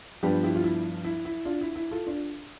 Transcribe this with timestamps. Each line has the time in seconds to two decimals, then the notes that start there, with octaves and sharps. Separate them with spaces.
0.23 G2 F3 B3 D4 G4 B4
0.43 E4 G4
0.55 F4
0.64 E4
1.04 E4
1.25 E4
1.45 D4 F4
1.61 E4
1.76 E4
1.91 F4 A4
2.07 D4 F4